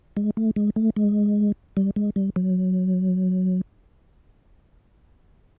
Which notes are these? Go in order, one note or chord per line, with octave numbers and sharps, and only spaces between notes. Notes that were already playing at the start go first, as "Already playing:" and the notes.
G#3
A3
G#3
A3
G#3
G3
G#3
G3
F#3